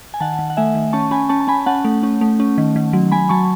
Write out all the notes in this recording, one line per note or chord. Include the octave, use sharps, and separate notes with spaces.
G#5
D#3 F#5 A5
D#3
F#5
A3 E5 G#5
D#3
C#4 A5 C#6
C#4 G#5 B5
C#4 A5 C#6
A5
C#4 G#5 B5
C#4 F#5 A5
A3
C#4
A3
C#4
D#3
D#3
F#3
F#3 G#5 B5
F#3 A5 C#6